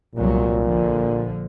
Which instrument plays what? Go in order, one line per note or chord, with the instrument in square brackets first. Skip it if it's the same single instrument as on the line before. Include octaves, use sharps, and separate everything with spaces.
[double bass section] F1 C2 F#3 [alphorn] A#2
[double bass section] A#1 D3 F3